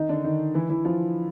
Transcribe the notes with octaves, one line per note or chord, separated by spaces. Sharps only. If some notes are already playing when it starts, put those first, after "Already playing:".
Already playing: D#3 D#4
D3 D4
D#3 D#4
E3 E4
E3 E4
F3 F4